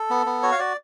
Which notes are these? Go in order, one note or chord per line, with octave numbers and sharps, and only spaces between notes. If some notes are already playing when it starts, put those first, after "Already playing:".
Already playing: A4
B3
B3
F#4 C#5
F5
F#4 D5